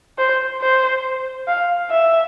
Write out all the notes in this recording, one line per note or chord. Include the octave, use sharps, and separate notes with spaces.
C5
C5
F5
E5